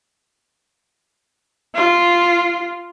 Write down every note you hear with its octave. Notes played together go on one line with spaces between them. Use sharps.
F4